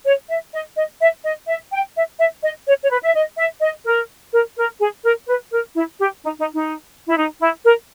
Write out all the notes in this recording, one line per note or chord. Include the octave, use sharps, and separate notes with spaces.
C#5
E5
D#5
D#5
E5
D#5
E5
G5
E5
E5
D#5
C#5
C#5
B4
E5
D#5
E5
D#5
A#4
A#4
A#4
G#4
A#4
B4
A#4
E4
G4
D#4
D#4
D#4
E4
D#4
E4
A#4